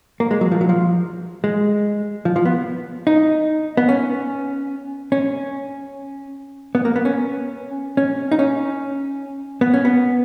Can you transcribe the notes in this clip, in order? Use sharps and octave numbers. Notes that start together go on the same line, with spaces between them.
A#3
G#3
F#3
F3
F#3
F3
G#3
F3
F3
B3
D#4
B3
C#4
C#4
B3
A#3
B3
C#4
C#4
D#4
C#4
B3
C#4
B3